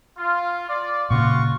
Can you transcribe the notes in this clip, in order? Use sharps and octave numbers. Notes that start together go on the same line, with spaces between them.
F4
F4 D5
A#2 C#3 F4 F#4 C#6